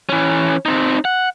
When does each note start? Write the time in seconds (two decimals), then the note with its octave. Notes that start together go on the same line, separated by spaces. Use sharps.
0.09 E3 C#4
0.66 C4 D#4
1.05 F#5